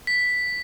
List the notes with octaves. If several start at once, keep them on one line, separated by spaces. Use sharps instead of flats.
B6